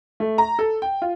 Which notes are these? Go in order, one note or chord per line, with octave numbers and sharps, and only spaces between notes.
A3
A#5
A4
G5
F4